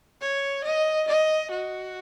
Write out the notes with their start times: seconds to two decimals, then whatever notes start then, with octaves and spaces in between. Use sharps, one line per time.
0.21 C#5
0.65 D#5
1.08 D#5
1.51 F#4